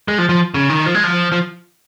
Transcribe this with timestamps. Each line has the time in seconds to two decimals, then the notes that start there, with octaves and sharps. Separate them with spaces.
0.08 G#3
0.18 F3
0.29 F3
0.54 C#3
0.70 D#3
0.86 F3
0.95 G#3
1.04 F3
1.32 F3